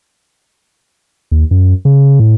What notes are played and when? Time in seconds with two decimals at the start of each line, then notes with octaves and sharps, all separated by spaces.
1.31 D#2
1.51 F#2
1.85 C#3
2.20 A2